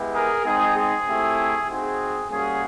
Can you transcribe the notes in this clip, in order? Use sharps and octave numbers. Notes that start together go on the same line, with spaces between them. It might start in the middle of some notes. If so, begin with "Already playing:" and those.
Already playing: G#3 B3 E4 G4
G#4 A#4
G#3 C4 D#4 G#4
G#4
A3 C4 E4 G4
C4 D#4 F#4 G#4
G3 A#3 C#4 F#4 G#4